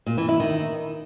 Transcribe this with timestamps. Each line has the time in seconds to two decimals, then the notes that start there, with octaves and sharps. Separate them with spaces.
0.06 A#2
0.18 E3
0.29 E4
0.40 D#3